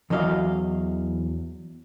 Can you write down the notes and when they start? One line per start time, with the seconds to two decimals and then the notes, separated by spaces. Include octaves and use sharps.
0.10 E2 E3 F#3 D#5 F5